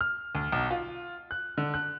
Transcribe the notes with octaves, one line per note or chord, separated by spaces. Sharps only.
F6
D2
B1
F4
F#6
D3
F#6